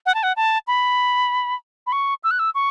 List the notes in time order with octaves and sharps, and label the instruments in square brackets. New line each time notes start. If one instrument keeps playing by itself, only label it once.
[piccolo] F#5
A5
F#5
A5
B5
B5
C#6
E6
F#6
E6
C#6